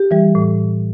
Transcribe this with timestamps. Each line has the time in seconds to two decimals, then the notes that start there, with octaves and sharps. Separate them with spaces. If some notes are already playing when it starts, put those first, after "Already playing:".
Already playing: G4
0.11 E3 G3
0.35 A2